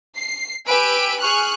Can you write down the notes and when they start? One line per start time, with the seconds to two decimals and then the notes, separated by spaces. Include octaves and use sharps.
0.17 C7
0.66 G4 B4 G#5 B5 E6 D7
1.20 G#4 G#5 C#6 F6 F#6